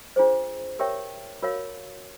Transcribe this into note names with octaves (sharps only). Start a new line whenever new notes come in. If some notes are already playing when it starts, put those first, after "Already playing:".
D4 F4 G#4 C5
G4 A#4 C#5 E5 G5
F#4 A#4 C#5 F5